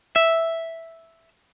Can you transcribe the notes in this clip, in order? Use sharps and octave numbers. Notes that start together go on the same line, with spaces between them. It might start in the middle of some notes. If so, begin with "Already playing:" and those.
E5